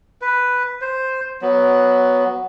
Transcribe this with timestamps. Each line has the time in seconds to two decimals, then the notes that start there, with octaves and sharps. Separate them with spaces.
0.21 B4
0.81 C5
1.42 F#3 B3